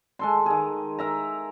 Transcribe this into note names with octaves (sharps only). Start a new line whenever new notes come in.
G#3 A4 C6
D#3 G#4
A#4 E5 A#5